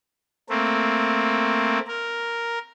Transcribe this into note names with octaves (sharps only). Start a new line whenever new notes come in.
A3 A#3 C4
A#4